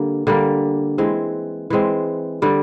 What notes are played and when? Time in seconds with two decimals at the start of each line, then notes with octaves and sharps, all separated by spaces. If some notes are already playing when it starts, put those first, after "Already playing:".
Already playing: D3 G3 A#3
0.27 D3 G3 A#3
0.98 E3 G#3 C4
1.70 E3 G#3 C4
2.42 D3 G3 C4